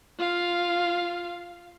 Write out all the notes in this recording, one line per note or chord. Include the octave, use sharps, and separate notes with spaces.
F4 F5